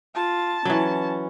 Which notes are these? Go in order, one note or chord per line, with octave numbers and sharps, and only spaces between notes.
F4 A5
E3 F#3 C#4